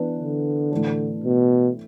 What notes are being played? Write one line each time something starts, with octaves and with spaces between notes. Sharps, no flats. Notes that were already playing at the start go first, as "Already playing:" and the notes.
Already playing: E3 B3 D4 B4
D3
A2 E3 D4 A4
B2